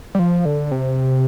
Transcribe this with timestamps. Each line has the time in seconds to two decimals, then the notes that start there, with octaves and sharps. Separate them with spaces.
0.15 G3
0.19 F3
0.45 D3
0.71 C3